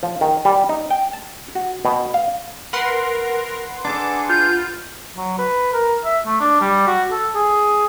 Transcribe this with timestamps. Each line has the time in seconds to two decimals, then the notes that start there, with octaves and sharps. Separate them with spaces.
0.03 F3
0.21 D#3
0.45 G3
0.69 D#4
0.90 G5
1.13 A5
1.55 F#4
1.85 B2
2.14 F5
2.73 A#4 B4 F#5 C6
3.85 D4 G#4 A4 D6
4.30 F4 G6
5.16 F#3
5.38 B4
5.73 A#4
6.05 E5
6.26 A3
6.40 D4
6.61 G3
6.87 F#4
7.11 A4
7.35 G#4